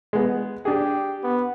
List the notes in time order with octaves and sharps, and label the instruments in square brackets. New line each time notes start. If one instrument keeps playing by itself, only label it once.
[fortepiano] G#3 B3
[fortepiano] D4 G#4 [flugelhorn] G4
[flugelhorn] B3